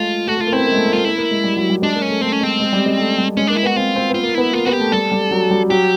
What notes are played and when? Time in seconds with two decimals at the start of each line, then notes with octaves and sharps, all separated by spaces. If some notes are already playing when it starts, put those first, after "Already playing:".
Already playing: G#3 A3 F4
0.27 A3 F#4
0.38 A3
0.40 F4
0.47 A#3
0.52 B3 C4 E4
0.67 A#3
0.72 G#3
0.76 A3
0.86 A#3
0.93 A3 F4
1.05 A#3 E4
1.18 A#3
1.31 G#3
1.44 G3
1.57 F#3
1.70 G3
1.82 G#3 D4
1.95 A#3
2.02 C#4
2.08 A3
2.21 A3 C4
2.32 C#4
2.41 G#3 C4
2.60 G#3
2.73 G3
2.86 G#3
2.99 A3
3.18 G3
3.37 G#3 C#4
3.47 A#3 D4
3.56 E4
3.63 B3 F#4
3.76 C4 F4
3.96 C4
4.09 B3
4.14 F4
4.23 A#3
4.35 B3 E4
4.53 A#3 F4
4.66 B3 F#4
4.73 G4
4.80 A3
4.92 G3 A4
5.12 G3
5.31 F#3
5.51 G3
5.70 F#3 G4